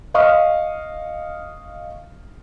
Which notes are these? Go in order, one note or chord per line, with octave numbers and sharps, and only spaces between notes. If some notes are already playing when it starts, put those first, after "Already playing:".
D#5 F5 C#6 D#6 F6